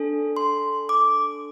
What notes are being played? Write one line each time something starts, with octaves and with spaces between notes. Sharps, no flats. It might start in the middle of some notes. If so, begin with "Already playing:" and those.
Already playing: D4 A4
C6
D6